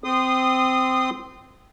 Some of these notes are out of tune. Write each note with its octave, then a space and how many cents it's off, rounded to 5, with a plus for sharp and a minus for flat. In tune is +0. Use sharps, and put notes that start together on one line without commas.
C4 -15 C6 -20 D#6 -20